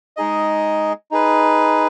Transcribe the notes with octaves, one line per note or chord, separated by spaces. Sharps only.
G#3 D#4 G#4 D#5
D#4 G#4 B4